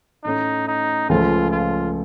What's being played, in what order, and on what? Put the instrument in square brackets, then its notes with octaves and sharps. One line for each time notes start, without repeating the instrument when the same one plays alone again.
[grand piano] A2 A3 C#4 [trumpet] D#4
[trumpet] D#4
[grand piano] C#2 C#3 F3 A3 [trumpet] F4
[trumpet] F4